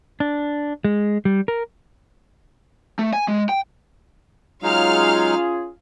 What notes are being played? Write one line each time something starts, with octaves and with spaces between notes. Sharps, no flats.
D4
G#3
G3
A#4
A3
G#5
G#3
G5
F#3 G#3 C#4 D#4 F4 G#4 F5 F6